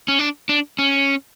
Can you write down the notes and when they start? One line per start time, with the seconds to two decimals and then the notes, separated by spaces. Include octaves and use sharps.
0.08 C#4
0.19 D4
0.49 D4
0.79 C#4